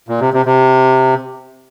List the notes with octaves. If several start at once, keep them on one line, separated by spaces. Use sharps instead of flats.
A#2
C3
C3
C3